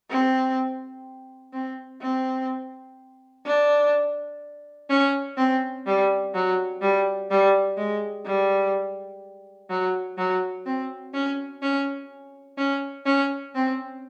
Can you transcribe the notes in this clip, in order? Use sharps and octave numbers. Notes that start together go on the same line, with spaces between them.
C4
C4
C4
D4
C#4
C4
G3
F#3
G3
G3
G#3
G3
F#3
F#3
C4
C#4
C#4
C#4
C#4
C4